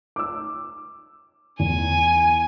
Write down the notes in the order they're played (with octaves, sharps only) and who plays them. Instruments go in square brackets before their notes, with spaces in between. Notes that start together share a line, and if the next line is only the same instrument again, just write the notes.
[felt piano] D6 E6
[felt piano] E2 [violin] G#5